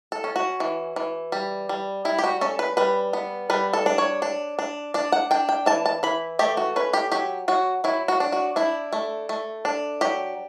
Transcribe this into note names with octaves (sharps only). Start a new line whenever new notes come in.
A4
C#4
F#4
E3
E3
G3
G3
G3 E4
G4
F#4
C#4 A4
B4
G3 B4
B3
G3 B4
A4
D4
C#5
D4
D4
D4 D5
F#5
D4 G5
G5
E3 A5
A5
E3 B5
A3 G4
F#4
C#4 B4
G4
F#3 G4
F#3 F#4
F#3 E4
F#4
D4
F#4
D4 E4
A3
A3
D4
F#3 G4